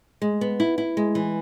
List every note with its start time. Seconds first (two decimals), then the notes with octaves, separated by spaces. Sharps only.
0.22 G#3
0.41 B3
0.60 E4
0.78 E4
0.97 G#3
1.15 E3